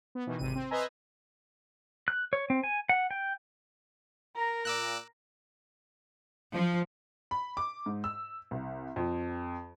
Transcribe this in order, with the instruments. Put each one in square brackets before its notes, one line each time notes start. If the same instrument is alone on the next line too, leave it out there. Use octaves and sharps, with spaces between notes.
[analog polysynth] B3
B2 D#3 E3
G#1 C3 D#7
C4
B4 C5 D#5 E5 G#5 A#5
[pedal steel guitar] F#6
C#5
C4
G#5
F#5
G5
[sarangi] A#4 [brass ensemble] A#5
[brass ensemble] A#2 [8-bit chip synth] D6 E6 F#6
[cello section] F3
[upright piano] B5
D6
G#2
E6
C2
F2